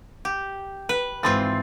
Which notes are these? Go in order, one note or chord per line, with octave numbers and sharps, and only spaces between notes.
G4
B4
G#1 E3 C4 F4 C6 A6